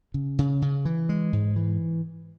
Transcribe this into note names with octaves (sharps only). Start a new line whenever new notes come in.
C#3
C#3
C#3
E3
G#3
G#2
E3